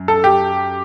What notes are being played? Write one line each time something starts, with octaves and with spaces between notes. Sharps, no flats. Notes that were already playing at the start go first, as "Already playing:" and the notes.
Already playing: F#2
A4
G4